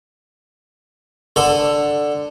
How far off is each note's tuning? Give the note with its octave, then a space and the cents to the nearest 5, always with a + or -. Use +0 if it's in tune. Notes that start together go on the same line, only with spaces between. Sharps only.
D3 +5 A4 +10